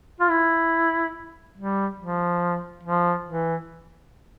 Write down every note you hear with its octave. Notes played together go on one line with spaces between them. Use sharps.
F4
E4
G3
F3
F3
E3